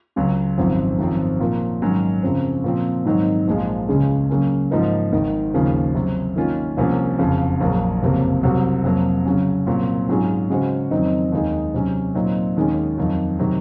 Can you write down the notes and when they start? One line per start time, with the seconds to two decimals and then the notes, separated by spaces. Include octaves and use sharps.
0.16 C#2 C#3 F#3
0.58 G#1 F#2 F3 C4
0.99 G#1 F#2 F3 C4
1.40 A#2 F3 A#3
1.82 G#2 D#3 F#3 C#4
2.23 F#2 C#3 F3 C4
2.64 A#2 F3 C4
3.05 G#2 D#3 F#3 C4 D#4
3.48 A#1 A#2 F3 G#3
3.88 C#2 C#3 G#3 C#4 G#4
4.29 C#3 F#3 A#3 C#4
4.71 G#2 F3 A#3 D#4 A#4
5.13 G#1 G#2 D#3
5.54 D#2 C#3 F3 A#3
5.94 C3 F#3 C4
6.36 D#3 A#3 C#4 F4
6.77 C2 C3 F3 A#3 C#4
7.19 F#1 F2 C#3
7.60 A#1 A#2 F#3 A#3
8.02 F#1 F2 C3 F#3 A#3
8.43 C2 C3 F#3 C4 F#4
8.84 F2 C3 F#3 A#3
9.25 C#3 F#3 C#4
9.67 C2 A#2 F#3 C4
10.09 G#2 F#3 C#4 F4 G#4
10.50 C#3 G#3 C#4 F#4 C5
10.91 F2 D#3 F#3 C4 D#4
11.32 D#2 D#3 G#3 D#4 G#4
11.74 C3 F#3 C#4
12.15 A#2 F#3 C4 D#4
12.57 D#2 D#3 G#3 C#4
12.98 F2 D#3 F#3
13.39 C3 D#3 F#3